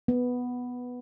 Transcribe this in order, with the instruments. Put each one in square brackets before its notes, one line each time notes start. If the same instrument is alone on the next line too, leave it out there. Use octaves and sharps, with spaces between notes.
[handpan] B3